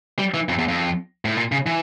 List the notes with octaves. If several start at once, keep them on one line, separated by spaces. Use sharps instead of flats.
G3
E3
F2
E2
F2
A2
A#2
C#3
E3